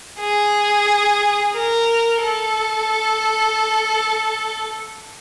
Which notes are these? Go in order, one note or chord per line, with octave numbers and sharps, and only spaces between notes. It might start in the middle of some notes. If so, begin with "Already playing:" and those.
G#4
A#4
A4